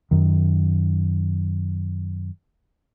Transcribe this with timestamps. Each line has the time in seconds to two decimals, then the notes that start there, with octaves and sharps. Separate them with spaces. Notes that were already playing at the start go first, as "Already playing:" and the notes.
0.11 F#2 D#3